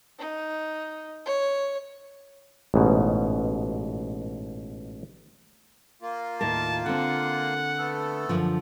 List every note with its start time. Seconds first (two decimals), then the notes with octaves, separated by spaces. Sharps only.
0.19 D#4
1.26 C#5
2.74 A1 G#2 B2
6.02 A#3 F4
6.41 D#2 A2 A#4 A5
6.86 D3 C4 F#5
7.78 A3 B3 A4
8.29 F#2 D3 F3